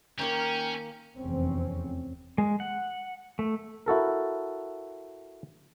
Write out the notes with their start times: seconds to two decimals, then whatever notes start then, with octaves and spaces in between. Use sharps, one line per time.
0.19 D#3 A#3 C#4 A#4 G5
1.17 F1 E2 C4 C#4
2.38 G#3
2.60 F#5
3.39 A3
3.86 E4 F#4 A4 A#4